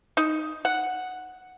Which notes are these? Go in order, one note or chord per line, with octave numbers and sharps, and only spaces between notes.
D#4
F#5